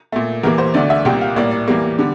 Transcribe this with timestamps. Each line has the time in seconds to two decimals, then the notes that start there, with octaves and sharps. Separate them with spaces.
0.12 A#2 A3
0.43 E2 E3 G3 A#3 A#4
0.58 C5
0.74 D2 D3 A3 D5
0.90 E5
1.05 C2 A#2 G3 A#3 G5
1.21 F5
1.36 A2 G3 A#3 D5
1.51 D5
1.68 E2 E3 G3 A#3
1.99 D3 G3